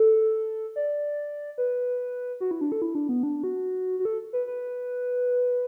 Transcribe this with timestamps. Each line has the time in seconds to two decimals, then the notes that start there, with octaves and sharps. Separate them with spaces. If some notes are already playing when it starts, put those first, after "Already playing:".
Already playing: A4
0.76 D5
1.58 B4
2.41 F#4
2.51 E4
2.61 D4
2.72 A4
2.82 E4
2.95 D4
3.09 B3
3.23 D4
3.44 F#4
3.99 F#4
4.05 A4
4.33 B4
4.47 B4